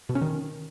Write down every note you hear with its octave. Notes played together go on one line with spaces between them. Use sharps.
B2
C#4
D#3